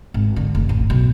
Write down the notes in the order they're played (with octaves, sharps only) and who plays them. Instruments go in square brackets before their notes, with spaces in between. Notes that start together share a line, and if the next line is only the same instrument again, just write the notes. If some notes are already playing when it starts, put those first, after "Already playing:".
[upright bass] G#1
D3
F1
A1
B1